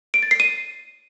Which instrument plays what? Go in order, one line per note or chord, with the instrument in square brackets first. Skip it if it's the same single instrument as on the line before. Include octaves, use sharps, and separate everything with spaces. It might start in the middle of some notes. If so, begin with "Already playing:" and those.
[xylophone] D7
A6
C7
D#7